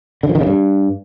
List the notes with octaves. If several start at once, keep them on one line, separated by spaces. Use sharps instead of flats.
D3
F3
D#3
C#3
G2